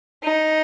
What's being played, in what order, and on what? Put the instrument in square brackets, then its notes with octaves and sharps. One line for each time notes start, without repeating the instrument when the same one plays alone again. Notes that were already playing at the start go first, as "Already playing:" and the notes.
[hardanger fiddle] D#4